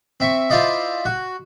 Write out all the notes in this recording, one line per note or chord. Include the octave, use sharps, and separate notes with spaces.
C4 E5 C#6
E4 F4 C5 D5 D#5
F#4